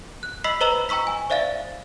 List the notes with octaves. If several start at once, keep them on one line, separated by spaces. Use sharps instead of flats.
F#6
D#5 B5 E6 B6 C7 F#7
B4 C5 D#5 A#5 E6 F7
G5 A#5 C#6 E6 B6
G#5
C5 D5 E5 F5 A6